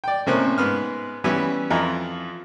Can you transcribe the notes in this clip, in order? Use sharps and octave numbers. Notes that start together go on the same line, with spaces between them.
D5 G5
A2 C3 A#3 C#4 C5 F#6
G#2 B3 F6
E3 G3 B3 C#4
F2 E3 F4 A#5